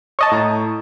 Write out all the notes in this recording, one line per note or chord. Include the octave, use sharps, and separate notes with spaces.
C#5 D#5 A5
A2 A#5